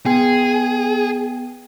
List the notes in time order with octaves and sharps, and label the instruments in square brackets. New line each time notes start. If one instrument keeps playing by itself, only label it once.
[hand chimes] B3 G5 [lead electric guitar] G#4